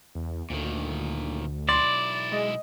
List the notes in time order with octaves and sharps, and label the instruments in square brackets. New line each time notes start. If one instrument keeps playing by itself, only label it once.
[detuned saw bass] E2
[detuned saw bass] D2 [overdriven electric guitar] A#2 D#3
[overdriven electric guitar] B1 E4 [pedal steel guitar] D5 [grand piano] C6
[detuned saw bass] G#3 [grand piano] D#5